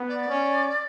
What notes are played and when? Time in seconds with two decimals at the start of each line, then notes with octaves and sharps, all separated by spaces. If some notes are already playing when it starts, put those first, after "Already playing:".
Already playing: B3
0.08 D5
0.28 C#4